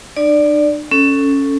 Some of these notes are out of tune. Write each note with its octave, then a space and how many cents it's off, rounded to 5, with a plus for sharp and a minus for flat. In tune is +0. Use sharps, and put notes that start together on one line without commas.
D4 +45 D5 +0
C#4 +0 A4 +10